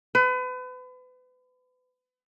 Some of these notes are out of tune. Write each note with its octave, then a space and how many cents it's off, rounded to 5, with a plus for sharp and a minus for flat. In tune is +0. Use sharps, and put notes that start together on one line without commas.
B4 +35